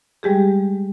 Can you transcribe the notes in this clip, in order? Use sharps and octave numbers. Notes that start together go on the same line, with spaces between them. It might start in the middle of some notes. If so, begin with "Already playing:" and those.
G3 G#3 G4 G#4